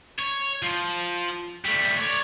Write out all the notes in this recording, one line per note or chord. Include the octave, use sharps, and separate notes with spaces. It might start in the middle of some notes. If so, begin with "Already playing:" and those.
C#5
F3
G3 A3
C#5 D5